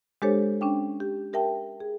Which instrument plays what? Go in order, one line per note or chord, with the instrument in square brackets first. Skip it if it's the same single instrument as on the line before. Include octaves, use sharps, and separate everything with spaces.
[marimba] G#3 D4 G4 A4 C5 C#5
C#4 D4 G5
G4
G4 A#4 E5 G5 A5
G#4